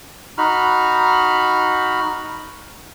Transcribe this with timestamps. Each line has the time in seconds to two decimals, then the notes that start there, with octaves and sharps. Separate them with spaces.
0.38 D#4 F#4 B5 F6